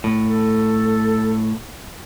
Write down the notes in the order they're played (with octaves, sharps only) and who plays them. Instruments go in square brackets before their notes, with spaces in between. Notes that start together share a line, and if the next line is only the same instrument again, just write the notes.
[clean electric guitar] A2
[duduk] A4